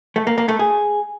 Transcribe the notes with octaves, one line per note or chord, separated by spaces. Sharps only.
A3
A#3
A#3
A3
G#4